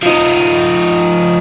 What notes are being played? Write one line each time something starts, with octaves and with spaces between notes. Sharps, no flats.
F3 D#4